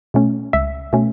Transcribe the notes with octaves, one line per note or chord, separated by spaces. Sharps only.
B2 A3 C#4
C#2 E5
B2 A3 C#4